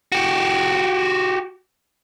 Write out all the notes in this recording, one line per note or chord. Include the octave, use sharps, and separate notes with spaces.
F#4 G4